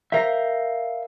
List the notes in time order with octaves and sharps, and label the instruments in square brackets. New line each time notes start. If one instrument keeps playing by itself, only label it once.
[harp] A#4 G5 A#5 [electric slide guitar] E5 F5